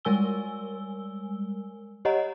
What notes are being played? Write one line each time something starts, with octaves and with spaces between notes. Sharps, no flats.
G3 G#3 A#4 G#5 E6 G7
G4 C#5 D#5 F#5 A#5